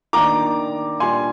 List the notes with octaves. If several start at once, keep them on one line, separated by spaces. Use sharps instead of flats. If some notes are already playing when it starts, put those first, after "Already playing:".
D#3 A#3 D4 A#5 D6
A#2 G3 D4 G#5 C6